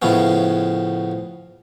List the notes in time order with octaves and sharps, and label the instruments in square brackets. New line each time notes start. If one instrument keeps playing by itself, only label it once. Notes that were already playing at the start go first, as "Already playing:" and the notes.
[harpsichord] A2 C#3 F3 B3 C#4